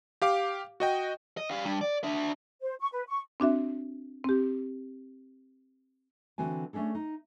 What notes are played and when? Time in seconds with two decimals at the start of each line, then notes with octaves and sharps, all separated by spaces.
0.22 G4 F5 D6
0.80 F#4 D#5 G5
1.37 D#5
1.51 G3 F5
1.65 G3 D4
1.81 D5
2.04 D4 E5
2.62 C5
2.80 C#6
2.93 B4
3.08 C#6
3.40 C4 D4 F#4 E5
4.24 C4 G4
6.38 D3 E3 C4 F#4 G#5
6.73 A3 C#4 D4 G#4 A4
6.95 D#4